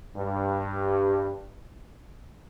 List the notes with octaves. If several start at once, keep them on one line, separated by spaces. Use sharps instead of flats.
G2